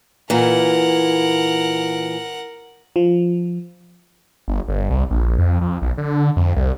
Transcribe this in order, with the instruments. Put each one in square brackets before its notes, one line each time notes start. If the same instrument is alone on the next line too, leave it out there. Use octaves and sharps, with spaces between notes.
[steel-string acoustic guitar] A#2 E3 [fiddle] A#4 F#5
[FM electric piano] F3
[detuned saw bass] G1
G1
C2
A#1
F2
F2
B1
D3
F2
C2